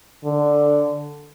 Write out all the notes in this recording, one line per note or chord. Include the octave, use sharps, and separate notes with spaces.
D3